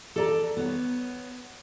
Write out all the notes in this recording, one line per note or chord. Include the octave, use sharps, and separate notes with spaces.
A4 D5 A#5
B3 C#5